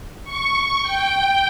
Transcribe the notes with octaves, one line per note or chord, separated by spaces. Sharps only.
C#6
G5